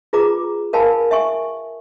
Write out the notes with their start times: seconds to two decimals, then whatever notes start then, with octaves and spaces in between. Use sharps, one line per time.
0.13 F4 G#4 B4 A#5 D6
0.73 A#4 B4 F5 G#5 A5 B5
1.11 E5 G#5 C#6